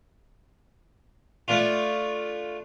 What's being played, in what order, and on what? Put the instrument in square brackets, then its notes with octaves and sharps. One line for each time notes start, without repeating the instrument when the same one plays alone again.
[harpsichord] A3 D4 F4